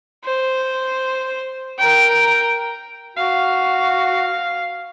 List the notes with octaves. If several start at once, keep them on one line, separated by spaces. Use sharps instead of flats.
C5
A#4 G5
F#4 F5